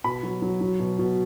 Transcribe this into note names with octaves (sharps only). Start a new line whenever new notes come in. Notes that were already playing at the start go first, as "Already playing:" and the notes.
B2 B5
F#3
F#3
F#3
B2
B2